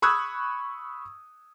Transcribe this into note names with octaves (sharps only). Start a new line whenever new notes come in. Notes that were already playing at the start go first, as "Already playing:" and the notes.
B5 C#6 D#6 E6 F#6 G#6